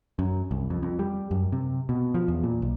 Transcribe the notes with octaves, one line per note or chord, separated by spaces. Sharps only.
F#2
C2
F2
F2
G3
F#2
C3
B2
F3
E2
A#2
B1